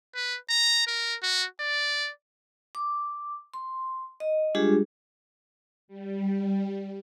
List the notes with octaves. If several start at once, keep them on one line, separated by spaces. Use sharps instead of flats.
B4
A#5
A#4
F#4
D5
D6
C6
D#5
G3 G#3 D4 F4 G4 G#4
G3